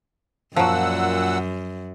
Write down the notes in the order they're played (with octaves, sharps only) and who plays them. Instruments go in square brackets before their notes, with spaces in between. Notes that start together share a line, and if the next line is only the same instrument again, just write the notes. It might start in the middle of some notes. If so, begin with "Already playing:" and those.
[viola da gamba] F#2 [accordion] A#2 F#5 E6 [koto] F3 F#3